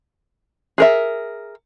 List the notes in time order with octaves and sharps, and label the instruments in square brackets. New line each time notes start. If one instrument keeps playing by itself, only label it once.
[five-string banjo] G#4 A#4 E5